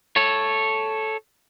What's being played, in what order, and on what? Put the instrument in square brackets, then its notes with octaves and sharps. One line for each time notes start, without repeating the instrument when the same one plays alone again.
[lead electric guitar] A4 C#5